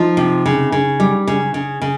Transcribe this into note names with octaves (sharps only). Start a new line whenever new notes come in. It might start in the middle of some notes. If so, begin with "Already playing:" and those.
Already playing: F3 D#4
C3
C#3
C#3
G3
C#3
C#3
C#3